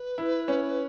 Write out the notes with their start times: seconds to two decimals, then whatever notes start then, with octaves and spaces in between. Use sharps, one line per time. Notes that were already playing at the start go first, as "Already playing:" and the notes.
Already playing: B4
0.18 E4
0.48 C#4